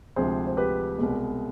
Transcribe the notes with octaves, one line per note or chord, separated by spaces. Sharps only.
D2 C3 F3 G#3 G#4 C5
C5
G4 B4
C2 B2 G#3